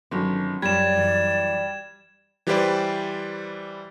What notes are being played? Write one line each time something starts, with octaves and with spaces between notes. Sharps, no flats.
G1 D#3 F#3 C#4
F#2 G3 D5 G#6 E7
F#2 E3
E3 G3 G4 B4 C5 D5